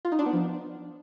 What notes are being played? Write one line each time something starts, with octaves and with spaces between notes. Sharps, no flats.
F4
D#4
D4
B3
F3